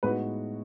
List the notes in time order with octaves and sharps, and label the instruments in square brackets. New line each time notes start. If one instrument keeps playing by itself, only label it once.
[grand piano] A2 G#3 B3 D#4 F#4 [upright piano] B4